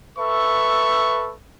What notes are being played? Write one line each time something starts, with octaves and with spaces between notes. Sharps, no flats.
A4 B4 E5 C#6